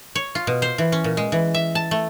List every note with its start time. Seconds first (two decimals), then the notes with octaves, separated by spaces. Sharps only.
0.15 C#5
0.35 F4
0.47 B2
0.62 C5
0.78 E3
0.92 C#4
1.04 A#2
1.17 G#3
1.32 E3
1.54 E5
1.75 A5
1.91 A3